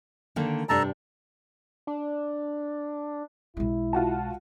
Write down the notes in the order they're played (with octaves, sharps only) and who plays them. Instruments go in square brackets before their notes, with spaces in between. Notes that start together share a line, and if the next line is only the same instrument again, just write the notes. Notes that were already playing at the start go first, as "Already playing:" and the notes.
[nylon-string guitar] D3 D#3 A#3
[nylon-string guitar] G2 C3 D4 [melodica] A4 A5 A#5
[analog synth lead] D4
[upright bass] B1 G#3 [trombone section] E4
[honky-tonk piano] F4 F#4 A5